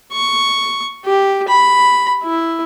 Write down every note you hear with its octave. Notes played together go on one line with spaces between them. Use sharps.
C#6
G4
B5
E4